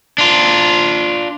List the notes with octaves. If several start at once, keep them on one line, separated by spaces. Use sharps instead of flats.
D4 F4